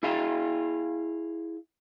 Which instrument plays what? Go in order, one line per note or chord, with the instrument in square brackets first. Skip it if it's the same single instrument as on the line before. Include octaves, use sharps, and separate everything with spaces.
[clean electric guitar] E4 G#4 E5 F5